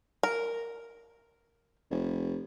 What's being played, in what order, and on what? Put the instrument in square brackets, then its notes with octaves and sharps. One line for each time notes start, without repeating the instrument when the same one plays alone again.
[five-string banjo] A#4
[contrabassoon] F1